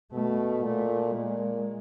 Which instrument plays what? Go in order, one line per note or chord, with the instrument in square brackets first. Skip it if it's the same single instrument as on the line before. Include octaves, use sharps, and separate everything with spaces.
[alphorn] B2 [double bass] A3
[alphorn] A#2 [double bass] A3
[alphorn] A#2 [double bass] G#3